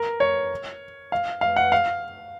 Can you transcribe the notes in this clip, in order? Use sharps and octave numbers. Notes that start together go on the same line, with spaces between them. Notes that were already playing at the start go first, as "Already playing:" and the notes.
Already playing: A#4
C#5
F5
F5
F#5
F5